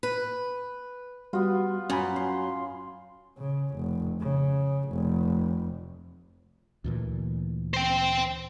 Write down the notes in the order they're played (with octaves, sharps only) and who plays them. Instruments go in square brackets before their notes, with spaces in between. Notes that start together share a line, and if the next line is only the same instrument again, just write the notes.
[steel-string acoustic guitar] B4
[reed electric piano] G3 F#4 [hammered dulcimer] B3 F4
[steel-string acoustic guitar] F#2 [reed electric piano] C#4 G#5 B5
[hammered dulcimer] C6
[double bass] C#3
F1
C#3
F1
[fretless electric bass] D2 A#2 E3
[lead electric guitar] C5 G5